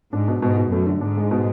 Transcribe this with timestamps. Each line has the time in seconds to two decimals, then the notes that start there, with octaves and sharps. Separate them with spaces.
0.13 G#2 D4
0.28 B2
0.42 G#2 B2
0.57 B2
0.71 F#2 A3
0.87 D3
1.01 G#2 D4
1.17 G#3
1.31 B2